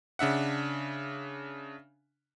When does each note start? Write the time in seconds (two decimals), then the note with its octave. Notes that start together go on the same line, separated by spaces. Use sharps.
0.19 C#3 D4 E5 F#5